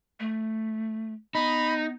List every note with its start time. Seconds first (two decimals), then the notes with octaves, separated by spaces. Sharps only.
0.20 A3
1.35 B3 D#4 B5